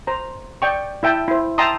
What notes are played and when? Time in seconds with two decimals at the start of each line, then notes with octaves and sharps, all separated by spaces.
0.07 C5 A#5
0.62 D5 G5 C#6
1.03 E4 E5 G5 A5
1.28 E4 C5
1.58 E5 G5 A5 A#5 C6 D#6